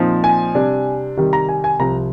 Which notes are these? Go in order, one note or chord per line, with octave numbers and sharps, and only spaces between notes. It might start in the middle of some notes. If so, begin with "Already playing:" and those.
Already playing: A#2 F3 C4 D#4
G#5
C3 G3 D4
C3 D#3 G3
A#5
G#5
G#5
C2 C3 F3 A#5